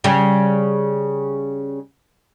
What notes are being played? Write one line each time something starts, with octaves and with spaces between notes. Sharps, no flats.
C#3 G3